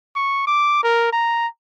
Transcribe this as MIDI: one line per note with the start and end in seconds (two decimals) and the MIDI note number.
0.16 0.47 85
0.47 0.81 86
0.84 1.09 70
1.12 1.47 82